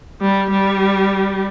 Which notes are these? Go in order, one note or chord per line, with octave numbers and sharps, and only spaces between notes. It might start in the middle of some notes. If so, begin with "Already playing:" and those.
G3
G3